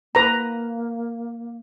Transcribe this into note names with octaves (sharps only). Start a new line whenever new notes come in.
A#3 B4 A#5